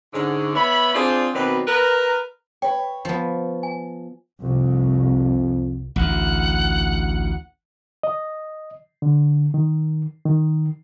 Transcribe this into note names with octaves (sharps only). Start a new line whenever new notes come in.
G#2 D3 C#4
B3 C#5 E5 B5
C4 D4 F4 G#4 C5 D5
B2 D#3 F#3 C4 B4 D5
A#4 B4 A#5
B4 C#5 G5
F3 B3
G#5
C2 F2
A1 D2 F#5
D#5
D3
D#3
D#3